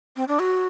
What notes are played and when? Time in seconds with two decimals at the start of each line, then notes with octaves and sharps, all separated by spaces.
0.16 C4
0.28 D4
0.39 F#4